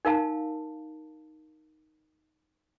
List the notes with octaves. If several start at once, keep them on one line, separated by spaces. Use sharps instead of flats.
D#4 A#4 F5 A5